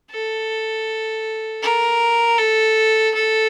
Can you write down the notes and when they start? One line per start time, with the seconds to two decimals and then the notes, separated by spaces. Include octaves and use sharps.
0.11 A4
1.63 A#4
2.38 A4
3.15 A4